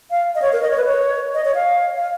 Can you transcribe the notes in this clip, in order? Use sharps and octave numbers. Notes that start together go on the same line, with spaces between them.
F5
D#5
C#5
A#4
D#5
C#5
B4
C#5
D#5
C#5
F5
F5